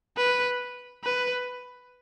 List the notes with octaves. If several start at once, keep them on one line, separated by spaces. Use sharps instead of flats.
B4
B4